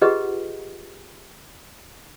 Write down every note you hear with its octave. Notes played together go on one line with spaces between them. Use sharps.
F4 G4 G#4 B4 D#5 F#5